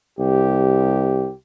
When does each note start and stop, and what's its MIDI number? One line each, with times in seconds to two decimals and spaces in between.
0.19 1.29 36
0.19 1.35 67